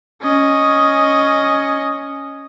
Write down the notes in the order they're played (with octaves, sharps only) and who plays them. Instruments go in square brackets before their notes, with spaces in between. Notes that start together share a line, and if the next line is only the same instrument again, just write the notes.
[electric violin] C#4 D#5